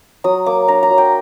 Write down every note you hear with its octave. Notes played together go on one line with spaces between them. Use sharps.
F#3 D#6
A#3 D6
D4 A#5
A#5
F#3
G5